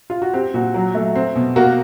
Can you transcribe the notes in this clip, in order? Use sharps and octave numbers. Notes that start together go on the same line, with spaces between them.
F4
F#4
C4 G4
A#2 F#4
F#3
A3
C4
B2
A#3 F#4